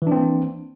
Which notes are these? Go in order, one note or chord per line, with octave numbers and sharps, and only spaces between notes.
E3 A#3 C4 D4